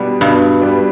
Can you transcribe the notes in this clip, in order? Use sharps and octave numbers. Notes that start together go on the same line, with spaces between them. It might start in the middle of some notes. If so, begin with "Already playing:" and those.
Already playing: B2 G3 B3 D4
G2 B2
G3 B3 D4